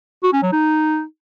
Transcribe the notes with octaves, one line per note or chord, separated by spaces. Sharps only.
F#4
C#4
F#3
D#4